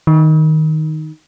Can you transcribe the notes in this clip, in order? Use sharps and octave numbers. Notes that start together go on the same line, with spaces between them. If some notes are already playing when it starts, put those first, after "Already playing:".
D#3